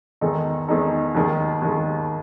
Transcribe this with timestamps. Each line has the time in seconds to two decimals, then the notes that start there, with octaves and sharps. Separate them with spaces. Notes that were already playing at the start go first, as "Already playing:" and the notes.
0.21 E2 D#3 G#3 D#4 A4
0.68 E2 D#3 G#3 D#4 A4
1.15 D#2 D#3 G#3
1.62 D#2 D#3 G#3